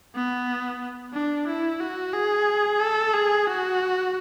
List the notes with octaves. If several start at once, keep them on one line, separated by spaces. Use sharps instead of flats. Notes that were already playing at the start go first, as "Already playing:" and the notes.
B3
D4
E4
F#4
G#4
A4
G#4
F#4